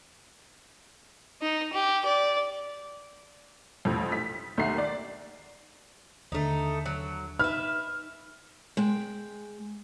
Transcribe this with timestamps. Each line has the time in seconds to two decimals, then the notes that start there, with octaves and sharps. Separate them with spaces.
1.42 D#4
1.73 G4
2.05 D5
3.85 A1 F2
4.12 B6
4.58 D#2 A3 F#5 A#5 C7
4.78 D5
6.32 D#2 D3 A3 D#4
6.86 F#3
7.39 D#4 B4 E5 F6
8.77 G#3 G5